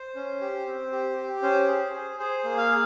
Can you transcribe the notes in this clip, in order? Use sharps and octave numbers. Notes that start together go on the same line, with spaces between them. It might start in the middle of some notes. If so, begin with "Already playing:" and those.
Already playing: C5
C#4
G4
C4
G4
G4
C#4 C5
G#4
G#4
G#4 C5
A#3
F5
G#4